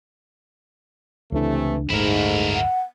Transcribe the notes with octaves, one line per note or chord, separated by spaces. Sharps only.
C#2 C3 E3 G#3 A3 D4
D1 G1 G#2 A3 D#4 E4 A#4
F#5